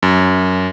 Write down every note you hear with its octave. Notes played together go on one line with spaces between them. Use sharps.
F#2